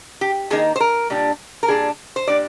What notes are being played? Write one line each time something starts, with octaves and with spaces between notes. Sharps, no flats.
G4
D#3 A#3 D#4 G#4
C5
A#4
A#2 G3 D4
A#4
A#2 G3 D4 G#4
C5
A#2 G3 D4 D5